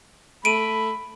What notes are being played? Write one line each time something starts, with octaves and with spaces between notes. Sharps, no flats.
A3 B5 D7 D#7